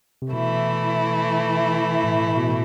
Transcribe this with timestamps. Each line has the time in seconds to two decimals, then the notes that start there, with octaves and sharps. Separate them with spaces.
0.22 C3
0.32 B2 E3 A3 E4
2.04 A2
2.37 B2
2.47 A2